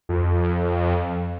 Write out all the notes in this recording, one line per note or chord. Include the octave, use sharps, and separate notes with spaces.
F2